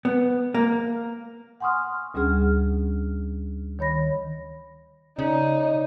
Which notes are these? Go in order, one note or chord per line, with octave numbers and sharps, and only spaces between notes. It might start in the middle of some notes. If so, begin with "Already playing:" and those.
B3
A#3
F#5 G#5 C6 C#6 D#6 F6
D2 G3 C#4 D4 G#4 F6
D#3 C#5 B5 A#6
C#3 D#4 C#5 D5